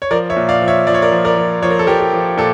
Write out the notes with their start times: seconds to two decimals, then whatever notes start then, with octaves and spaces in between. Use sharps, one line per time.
0.02 C#5
0.11 F3 A#4 D5
0.30 C#5 E5
0.36 A#2
0.49 D5 F5
0.62 F3
0.68 C#5 E5
0.87 F3 D5
0.94 C#5
1.02 A#4 D5
1.12 F3
1.25 A#4 D5
1.37 F3
1.62 F3 C#5
1.70 A#4
1.79 A4
1.87 F3 G4 A#4
2.00 G4
2.13 F3
2.37 A#2 A4